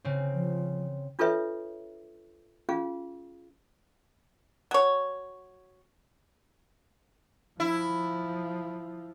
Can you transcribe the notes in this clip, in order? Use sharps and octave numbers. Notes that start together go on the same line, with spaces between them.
C#3 C4
F3
D4 F4 A4 B4 C#5 E5
C#4 F4 G#4 F5
F#3 C#5
F3 E4